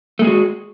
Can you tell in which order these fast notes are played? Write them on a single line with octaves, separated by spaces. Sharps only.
A3 G#3 G#4 F#4